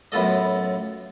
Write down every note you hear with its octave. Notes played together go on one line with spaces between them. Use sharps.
F#2 A2 B3 F4 A4 D#5